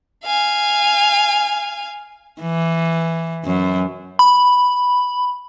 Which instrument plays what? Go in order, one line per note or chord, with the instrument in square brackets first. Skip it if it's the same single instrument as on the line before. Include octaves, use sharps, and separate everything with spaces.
[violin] F5 G#5
[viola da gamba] E3
F#2
[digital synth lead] B5